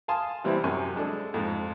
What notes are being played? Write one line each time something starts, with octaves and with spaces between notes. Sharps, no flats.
F5 G#5 A5 C6 D#6
C3 E3 G3 B3 C4
F#2 C3 G#5 C#6
G#3 D4 A4
F2 G#2